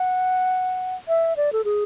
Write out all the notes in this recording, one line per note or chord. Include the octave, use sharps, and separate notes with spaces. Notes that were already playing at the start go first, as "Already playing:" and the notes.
Already playing: F#5
E5
D5
A4
G#4